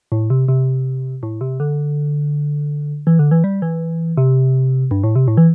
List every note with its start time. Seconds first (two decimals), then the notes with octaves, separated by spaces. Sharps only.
0.12 A2
0.30 C3
0.48 C3
1.23 A2
1.41 C3
1.60 D3
3.07 E3
3.19 D3
3.31 E3
3.44 G3
3.62 E3
4.17 C3
4.91 G2
5.04 A2
5.15 C3
5.28 A2
5.37 E3